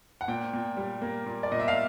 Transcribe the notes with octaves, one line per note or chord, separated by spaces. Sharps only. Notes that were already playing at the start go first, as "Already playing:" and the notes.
F#5
A#2 G5
A#2
G3
A#3
A#2
D5
A#2 D#5
E5
F5